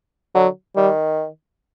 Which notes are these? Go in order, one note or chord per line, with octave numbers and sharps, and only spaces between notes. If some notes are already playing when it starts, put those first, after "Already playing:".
D3 F#3
D#3 G3